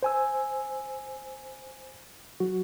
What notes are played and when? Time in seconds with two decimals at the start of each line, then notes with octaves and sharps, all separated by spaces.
0.03 C5 G#5 E6
2.40 F#3 F#4